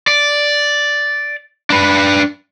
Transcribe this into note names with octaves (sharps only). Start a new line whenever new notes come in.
D5
D4 B4